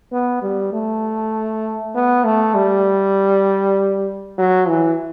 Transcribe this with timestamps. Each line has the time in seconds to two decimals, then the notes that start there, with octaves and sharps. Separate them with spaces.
0.12 B3
0.42 G3
0.73 A3
1.94 B3
2.24 A3
2.54 G3
4.38 F#3
4.68 E3